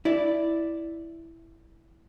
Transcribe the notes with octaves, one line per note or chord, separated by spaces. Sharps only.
E4 D5